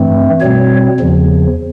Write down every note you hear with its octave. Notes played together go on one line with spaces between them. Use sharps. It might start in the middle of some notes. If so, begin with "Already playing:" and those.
Already playing: G2 E3 A3 C4
B2 G3 C4 C#5
E2 C#3 F3